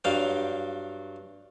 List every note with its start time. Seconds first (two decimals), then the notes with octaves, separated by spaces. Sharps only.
0.04 G2 F#3 F5 G5